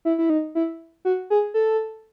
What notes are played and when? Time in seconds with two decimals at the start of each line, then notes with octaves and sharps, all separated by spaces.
0.05 E4
0.18 E4
0.30 D#4
0.55 E4
1.05 F#4
1.30 G#4
1.54 A4